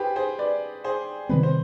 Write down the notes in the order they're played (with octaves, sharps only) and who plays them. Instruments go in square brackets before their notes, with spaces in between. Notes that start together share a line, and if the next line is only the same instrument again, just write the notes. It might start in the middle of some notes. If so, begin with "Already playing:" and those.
Already playing: [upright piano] G4 G#4 B4 C5
G#4 C5
B4 D5
G#4 C5
[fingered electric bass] C3 D#3 G3 C4 [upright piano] B4
[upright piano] C5